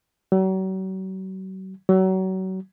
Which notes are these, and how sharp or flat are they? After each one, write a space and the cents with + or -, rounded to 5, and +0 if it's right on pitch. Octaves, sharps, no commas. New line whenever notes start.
F#3 +40
F#3 +30